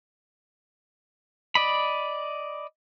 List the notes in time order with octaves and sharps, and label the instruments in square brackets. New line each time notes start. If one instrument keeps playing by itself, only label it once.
[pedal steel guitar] D5 D#5 B5